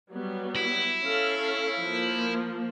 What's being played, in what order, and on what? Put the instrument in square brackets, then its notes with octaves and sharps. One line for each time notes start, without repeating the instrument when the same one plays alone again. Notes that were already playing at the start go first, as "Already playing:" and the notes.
[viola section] F#3 G3 B3
[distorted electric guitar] E4
[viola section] C#4 A4 F5
F3 A#3